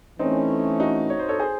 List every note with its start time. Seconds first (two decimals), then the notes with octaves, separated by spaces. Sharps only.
0.19 E3 A3 C4 C#4 D#4
0.80 D#4 F#4
1.10 C#5
1.19 C5
1.29 A4 C#5
1.39 G#4 C5